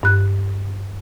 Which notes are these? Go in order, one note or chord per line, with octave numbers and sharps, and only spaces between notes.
G2 F#6